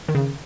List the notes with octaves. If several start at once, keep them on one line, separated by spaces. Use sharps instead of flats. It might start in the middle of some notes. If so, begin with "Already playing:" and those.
D#3
C#3